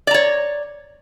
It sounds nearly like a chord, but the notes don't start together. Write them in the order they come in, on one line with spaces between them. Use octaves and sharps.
D5 A#5 C#5